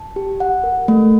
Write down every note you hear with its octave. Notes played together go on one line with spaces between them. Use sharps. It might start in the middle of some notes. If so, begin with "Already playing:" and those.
Already playing: A5
G4
F#5
A#4
A3